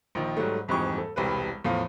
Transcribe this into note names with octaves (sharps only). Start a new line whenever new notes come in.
A#1 D#3
G#2 F#3 G3 A3
D#1 F2 G#2 E3 G4 C#6
A4
E1 C2 G3 B4
E2 A2 F3 F5